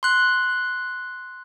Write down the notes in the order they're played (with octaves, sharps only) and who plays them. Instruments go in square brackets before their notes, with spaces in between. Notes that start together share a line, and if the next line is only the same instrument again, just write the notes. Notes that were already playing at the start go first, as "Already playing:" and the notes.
[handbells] C6 F#6